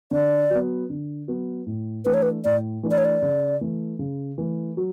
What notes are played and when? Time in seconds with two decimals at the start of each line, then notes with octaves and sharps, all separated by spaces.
0.11 D3 D5
0.50 F#3 B3
0.90 D3
1.28 F#3 B3
1.66 A2
2.05 E3 A3 D4 B4
2.14 C#5
2.22 B4
2.45 A2 D5
2.83 E3 A3 D4
2.91 D5
2.98 C#5
3.05 D5
3.22 C#3
3.61 E3 A3
3.99 C#3
4.38 E3 A3
4.77 F#3